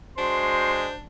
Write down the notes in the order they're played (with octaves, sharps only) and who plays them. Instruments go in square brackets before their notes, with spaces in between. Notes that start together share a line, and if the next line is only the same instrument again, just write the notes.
[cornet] G#3 [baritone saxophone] D4 [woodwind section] F#4 C5 [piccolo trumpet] C6